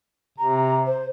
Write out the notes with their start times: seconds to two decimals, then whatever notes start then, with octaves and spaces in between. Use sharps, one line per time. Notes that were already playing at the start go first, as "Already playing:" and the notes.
0.38 C3 A#5
0.86 C5